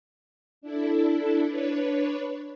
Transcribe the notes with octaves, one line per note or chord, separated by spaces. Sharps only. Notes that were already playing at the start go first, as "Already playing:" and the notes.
D4 E4 A4
D4 B4 C#5